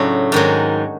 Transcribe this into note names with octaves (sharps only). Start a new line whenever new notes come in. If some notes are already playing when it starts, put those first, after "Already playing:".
Already playing: A2 C#3 F#3 D4
G#2 D#3 F#3